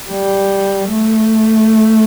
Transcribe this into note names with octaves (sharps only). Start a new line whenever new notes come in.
G3
A3